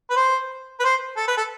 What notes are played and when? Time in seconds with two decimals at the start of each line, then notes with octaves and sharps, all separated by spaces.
0.10 B4
0.17 C5
0.80 B4
0.85 C5
1.17 A4
1.28 B4
1.37 A4